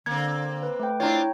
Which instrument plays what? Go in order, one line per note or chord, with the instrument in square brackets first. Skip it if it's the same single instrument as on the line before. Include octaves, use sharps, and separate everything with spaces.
[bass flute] D3 [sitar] A#3 C4 [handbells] G#6
[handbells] B4
A3 G5
[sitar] C4 D4 F4 [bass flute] E4 [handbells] C#5 G5 A#5